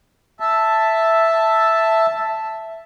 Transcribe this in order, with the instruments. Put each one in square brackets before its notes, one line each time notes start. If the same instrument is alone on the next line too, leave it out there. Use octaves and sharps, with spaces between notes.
[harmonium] E5 A5